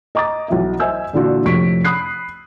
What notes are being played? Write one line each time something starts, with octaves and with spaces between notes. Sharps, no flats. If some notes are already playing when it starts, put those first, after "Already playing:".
D#5 A#5 D6 D#6 A6
B1 E3 E5
C5 D#5 E5 G#5 E6 G6
A#2 D3 E3 D4 F4 F#4
F2 A2 C3 C#6 B6 D7
B5 D#6 F#6 C7